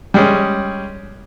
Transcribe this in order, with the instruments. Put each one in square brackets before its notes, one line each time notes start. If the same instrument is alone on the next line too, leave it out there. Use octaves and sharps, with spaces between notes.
[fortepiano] G3 G#3 C#4